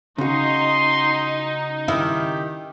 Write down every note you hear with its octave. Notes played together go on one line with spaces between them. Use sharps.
C#3 D#4 F#4 C6
D#3 E4 G4